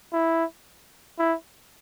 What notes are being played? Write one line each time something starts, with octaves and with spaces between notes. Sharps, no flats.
E4
E4